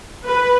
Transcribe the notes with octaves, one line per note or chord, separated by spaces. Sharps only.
B4